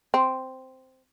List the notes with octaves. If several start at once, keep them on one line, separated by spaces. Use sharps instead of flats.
C4